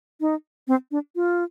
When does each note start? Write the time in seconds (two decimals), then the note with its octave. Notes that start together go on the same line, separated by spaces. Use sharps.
0.21 D#4
0.68 C4
0.91 D4
1.16 F4